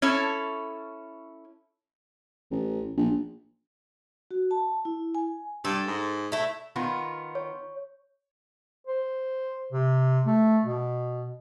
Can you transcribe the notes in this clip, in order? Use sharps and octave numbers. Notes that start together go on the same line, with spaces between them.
C#4 E4 A4 C#5
A1
A#1
F#4
A5
E4
G#5
G2 A4
G#2
A3 E4
D#3 B3 F4
C#5
C5
C3
A3
B2